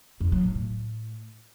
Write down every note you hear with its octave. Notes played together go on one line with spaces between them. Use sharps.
F2
F#3
A2
A2